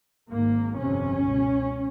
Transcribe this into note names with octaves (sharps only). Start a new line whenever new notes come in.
G#1 G#2 A#3
G1 F2 C3 C#4
C#2 B2